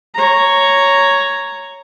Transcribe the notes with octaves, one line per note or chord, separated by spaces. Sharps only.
C#5 A#5